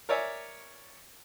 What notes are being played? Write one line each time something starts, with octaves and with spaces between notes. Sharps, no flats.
A#4 C#5 D5 E5 G#5